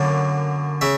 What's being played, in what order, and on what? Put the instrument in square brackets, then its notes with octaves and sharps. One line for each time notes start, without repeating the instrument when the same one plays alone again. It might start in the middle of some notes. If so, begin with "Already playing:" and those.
Already playing: [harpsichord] F#2 D3 F#3 A#3
C#3 E5